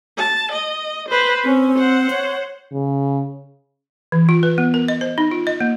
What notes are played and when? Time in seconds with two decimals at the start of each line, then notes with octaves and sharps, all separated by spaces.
0.17 A5
0.52 D#5
1.08 B4 C5
1.45 C4 C#4
1.78 C5 F#5
2.11 C#5
2.72 C#3
4.12 E3
4.29 F4
4.43 B4
4.58 B3
4.74 A#4
4.88 D#5
5.01 C5
5.18 D#4
5.31 F4
5.47 D#5
5.61 A#3